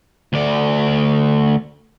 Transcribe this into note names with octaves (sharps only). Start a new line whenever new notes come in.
D2 D5